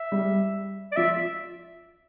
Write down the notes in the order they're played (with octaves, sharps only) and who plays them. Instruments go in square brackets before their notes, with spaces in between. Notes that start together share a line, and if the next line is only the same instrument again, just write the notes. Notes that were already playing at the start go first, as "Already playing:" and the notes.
Already playing: [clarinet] E5
[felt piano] G3
[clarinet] D5
[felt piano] F3 [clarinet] E5